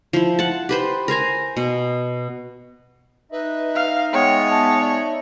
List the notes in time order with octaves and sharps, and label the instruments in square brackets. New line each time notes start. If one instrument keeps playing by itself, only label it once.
[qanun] F3 E4
F#5 A5
G4 B4 C5
A#4 C5 G#5 A#5
B2
[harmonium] D#4 D#5 E5 [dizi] B4
[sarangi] F5
[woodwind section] G#3 B3 [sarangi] C#5 [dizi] G5
[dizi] A5
D5